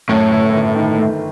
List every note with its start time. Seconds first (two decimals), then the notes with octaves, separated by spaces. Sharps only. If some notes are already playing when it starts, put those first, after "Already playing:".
0.08 F#2 A2
0.31 G1
0.53 G1
0.75 D#3
0.98 A3